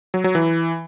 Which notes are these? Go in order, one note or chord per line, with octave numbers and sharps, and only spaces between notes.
F#3
F#3
E3